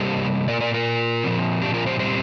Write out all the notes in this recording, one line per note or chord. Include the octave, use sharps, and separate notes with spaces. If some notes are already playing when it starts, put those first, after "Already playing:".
Already playing: C3 G3 A#3 G4 C5
A#2 A#3 A#4 D5
A#4 D5
F4 A#4
A#2 F3 C4
D4 G4
F4 A#4
G4 C5
A#2 G3 C4 G4 C5